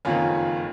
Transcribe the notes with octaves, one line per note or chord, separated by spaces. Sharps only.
F#1 F2 D#3 C#4 F4